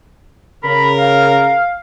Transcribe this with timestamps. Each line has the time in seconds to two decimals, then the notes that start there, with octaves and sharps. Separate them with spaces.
0.63 C#3 A#4 B5
0.98 F5